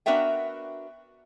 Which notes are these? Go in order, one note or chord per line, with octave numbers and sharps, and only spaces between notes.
B3 D4 F#4 A#4 E5 G5